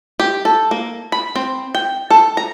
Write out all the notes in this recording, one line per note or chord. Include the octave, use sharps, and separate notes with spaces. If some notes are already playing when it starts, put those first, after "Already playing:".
G4
A4
A#3
B5
C4
G5
A4
A#5